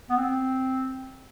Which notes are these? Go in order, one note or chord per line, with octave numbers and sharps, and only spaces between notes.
B3
C4